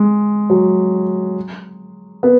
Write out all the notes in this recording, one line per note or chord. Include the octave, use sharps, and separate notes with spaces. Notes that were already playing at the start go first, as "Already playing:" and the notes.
Already playing: G#3
F#3
B3